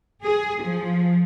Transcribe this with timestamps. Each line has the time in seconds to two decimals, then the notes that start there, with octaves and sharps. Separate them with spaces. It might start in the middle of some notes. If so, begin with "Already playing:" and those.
0.23 G#4
0.61 F3